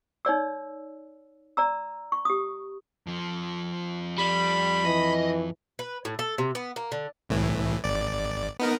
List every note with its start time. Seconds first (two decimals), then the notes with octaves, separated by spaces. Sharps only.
0.25 D#4 C#5 D5 E6
1.57 D5 A#5 E6
2.12 C#6
2.25 G4 D#6
3.07 F2 F3
4.18 G3 B5
4.85 E3 D#5
5.79 B4
6.05 A2
6.19 A4
6.38 C3
6.55 B3
6.76 A#3
6.92 D3
7.29 C2 A2 E3
7.84 G#1 D5
8.59 B3 D#4 A#4